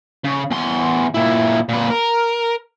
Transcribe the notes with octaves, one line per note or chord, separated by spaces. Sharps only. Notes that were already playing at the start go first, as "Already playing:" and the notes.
C#3
E2 C6
A#2 E4
A#2 B4
A#4